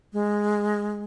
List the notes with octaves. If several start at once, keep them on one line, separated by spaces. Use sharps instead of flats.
G#3